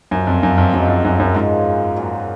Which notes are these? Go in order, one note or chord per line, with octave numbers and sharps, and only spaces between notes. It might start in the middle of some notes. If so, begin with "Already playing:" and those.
F#2 F3 A#3 C#4
F2
F#2
F2
F#2 F#3 A#3 D#4 G#4
F2
F#2
F#2
G#2 F3 G#3 C#4 F4
A#2 F#3 A#3